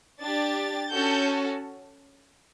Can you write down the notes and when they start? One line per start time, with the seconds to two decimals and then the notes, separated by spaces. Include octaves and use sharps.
0.21 D4 G4 A6
0.91 C#4 F#4 A4 G6